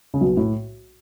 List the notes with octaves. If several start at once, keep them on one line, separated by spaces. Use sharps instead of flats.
C#3
B1 B2
A2